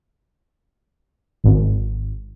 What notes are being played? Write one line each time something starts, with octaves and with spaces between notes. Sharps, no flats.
G#1